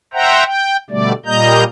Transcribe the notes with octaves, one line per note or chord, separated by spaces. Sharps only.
C5 E5 F#5 G5 A#5
G5
B2 D3 G3 A3 D5
A#2 G3 A#3 D#5 A#5 G6